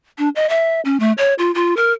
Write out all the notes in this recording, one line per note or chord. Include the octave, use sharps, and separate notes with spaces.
D4
D#5
E5
C#4
A3
C#5
F4
F4
A#4